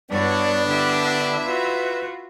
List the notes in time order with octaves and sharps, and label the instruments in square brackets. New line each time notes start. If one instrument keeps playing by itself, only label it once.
[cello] G2 [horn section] B3 D4 [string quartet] E4 F#4 C#5 [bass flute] D5
[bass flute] D3 [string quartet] E4 E5 [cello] G4 D5
[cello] F4 F#4 [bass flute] B4